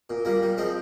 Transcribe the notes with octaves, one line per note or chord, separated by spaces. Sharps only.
A#2
A#2 G3 A#3
G3
F3 G#3 C4